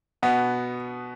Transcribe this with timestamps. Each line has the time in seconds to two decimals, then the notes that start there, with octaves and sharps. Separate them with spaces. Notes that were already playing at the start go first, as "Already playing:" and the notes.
0.23 B2 B3